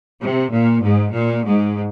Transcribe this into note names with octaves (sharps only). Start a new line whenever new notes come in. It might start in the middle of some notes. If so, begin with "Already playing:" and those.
C3
A#2
G#2
A#2
G#2